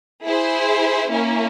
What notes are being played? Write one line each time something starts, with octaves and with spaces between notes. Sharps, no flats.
E4 G#4 C5
A#3 C#4 E4